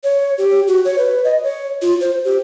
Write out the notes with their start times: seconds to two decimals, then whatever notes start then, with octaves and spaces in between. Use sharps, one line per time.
0.04 C#5
0.38 G4
0.68 F#4
0.85 C#5
0.98 B4
1.24 D#5
1.43 C#5
1.82 F4
2.01 C5
2.24 G4